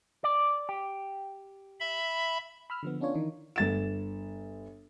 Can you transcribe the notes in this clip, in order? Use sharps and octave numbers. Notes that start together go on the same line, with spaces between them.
D5
G4
E5 B5
B5 E6 F6
D3 F3 B3
B3 C#4 D4 F4 C#5
D#3 E3 D#4
G1 A6 E7